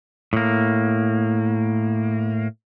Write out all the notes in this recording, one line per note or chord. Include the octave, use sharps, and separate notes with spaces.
A2 A#3